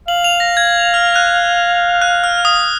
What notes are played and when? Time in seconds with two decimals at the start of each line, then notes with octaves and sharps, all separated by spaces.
0.08 F5 F#7
0.24 F7
0.40 A#6
0.57 G#6
0.94 F6
1.16 F#6
2.02 F#6
2.24 F6
2.45 D#6